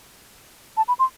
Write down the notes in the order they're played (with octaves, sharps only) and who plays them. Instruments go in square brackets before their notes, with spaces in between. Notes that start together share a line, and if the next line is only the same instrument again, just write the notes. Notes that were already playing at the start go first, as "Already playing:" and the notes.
[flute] A5
B5
C6